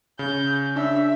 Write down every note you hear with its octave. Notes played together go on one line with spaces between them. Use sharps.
C#3 G6
D4 E5